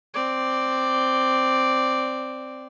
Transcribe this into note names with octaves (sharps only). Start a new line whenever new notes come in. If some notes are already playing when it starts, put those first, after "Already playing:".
C4 D5